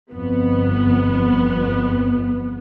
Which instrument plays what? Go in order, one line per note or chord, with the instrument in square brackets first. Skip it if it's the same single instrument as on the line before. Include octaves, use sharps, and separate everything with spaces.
[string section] G1 F2 B3